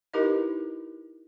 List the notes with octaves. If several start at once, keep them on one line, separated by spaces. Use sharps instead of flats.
D#4 E4 G4 A#4 B4 D#5